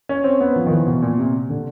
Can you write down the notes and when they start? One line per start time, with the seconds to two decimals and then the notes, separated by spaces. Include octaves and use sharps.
0.09 C#4
0.24 C4
0.41 B3
0.56 F3
0.66 D#3
0.71 E3
0.86 B2
1.02 A#2
1.18 C3
1.50 D3